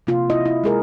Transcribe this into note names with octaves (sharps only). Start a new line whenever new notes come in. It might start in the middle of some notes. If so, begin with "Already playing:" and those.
C3 A#3 F4
E4 D#5
E4
G#3 G#4 A#4